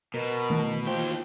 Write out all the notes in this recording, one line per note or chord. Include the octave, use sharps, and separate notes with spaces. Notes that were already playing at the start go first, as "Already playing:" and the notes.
B2 A#4
D#3 E3 A3
D#2 F4 C5 G5